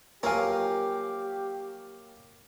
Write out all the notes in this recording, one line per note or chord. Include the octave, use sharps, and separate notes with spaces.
F3 F#3 A#3 G4 A#4 F5 G#5